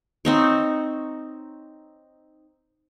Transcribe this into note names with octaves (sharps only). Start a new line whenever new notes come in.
C4 D#4 C#5